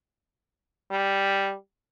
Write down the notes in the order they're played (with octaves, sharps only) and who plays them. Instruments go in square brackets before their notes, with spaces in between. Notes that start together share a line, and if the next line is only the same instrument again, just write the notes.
[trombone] G3